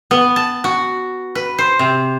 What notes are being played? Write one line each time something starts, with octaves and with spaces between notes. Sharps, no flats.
B3
A5
F#4
B4
C5
C3